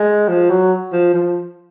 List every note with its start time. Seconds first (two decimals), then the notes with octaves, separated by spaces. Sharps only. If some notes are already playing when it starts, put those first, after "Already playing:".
Already playing: G#3
0.28 F3
0.50 F#3
0.93 F3
1.14 F3